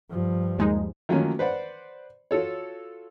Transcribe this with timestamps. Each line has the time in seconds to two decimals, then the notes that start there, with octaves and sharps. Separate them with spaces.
0.10 G2 F3
0.58 D#2 G#3 D#4
1.09 D#3 F3 F#3 A3 A#3 C#4
1.39 B4 C5 D5 F#5
2.31 F4 F#4 A4 C#5